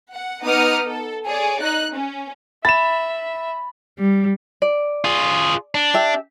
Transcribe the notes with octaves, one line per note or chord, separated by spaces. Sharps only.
F#5
B3 D#4 D6 D#6 F6 C#7
A4
G#4 C#5 D5
D#4 F#6
C#4
E5 B5 A6 E7
G3
D5
F4 G#4
D4
G4 E5